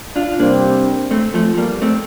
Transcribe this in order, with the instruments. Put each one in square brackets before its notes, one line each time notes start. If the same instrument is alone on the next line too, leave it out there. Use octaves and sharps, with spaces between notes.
[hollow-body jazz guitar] D4 F4
[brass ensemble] C3 G3 C4 [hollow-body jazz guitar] A#3 D4
[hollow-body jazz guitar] A3 C4
F3 A3
G3 A#3
A3 C4